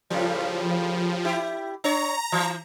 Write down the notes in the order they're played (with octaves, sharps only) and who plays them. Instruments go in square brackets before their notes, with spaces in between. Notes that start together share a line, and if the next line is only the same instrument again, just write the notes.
[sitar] A2 C#3 G3 [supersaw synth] F3
[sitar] E4 G4
[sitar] D4 C#5 [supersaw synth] A#5
[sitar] E3